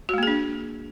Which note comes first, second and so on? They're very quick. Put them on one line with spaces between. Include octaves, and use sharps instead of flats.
F#4 G#3 A#3 G#4 D4